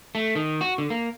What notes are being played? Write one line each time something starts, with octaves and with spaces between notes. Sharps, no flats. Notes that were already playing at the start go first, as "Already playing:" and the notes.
A3
D#3
F#4
D3
A#3